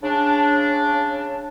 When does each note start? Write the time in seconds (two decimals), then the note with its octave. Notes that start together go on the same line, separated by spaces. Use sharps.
0.03 C#3 D4